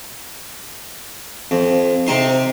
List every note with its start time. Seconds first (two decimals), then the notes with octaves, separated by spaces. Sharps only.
1.51 F2
2.07 C3 C4 D#4 C6